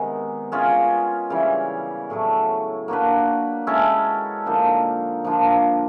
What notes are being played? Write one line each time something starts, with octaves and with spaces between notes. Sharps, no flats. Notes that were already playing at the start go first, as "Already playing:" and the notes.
Already playing: C3 D#3 G#3 B3
G#3 C#4 F4 G#4
C#3 E3 G3
A2 F#3 A3
A#3 D4 F#4 B4
G#3 C#4 E4 A4
D3 F3 A#3 D#4
F3 A#3 D4 F4